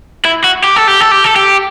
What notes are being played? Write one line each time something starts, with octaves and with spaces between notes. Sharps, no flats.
E4
F#4
G4
A4
G4
A4
G4
A4
G4